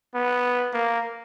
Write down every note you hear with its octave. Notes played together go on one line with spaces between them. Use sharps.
B3
A#3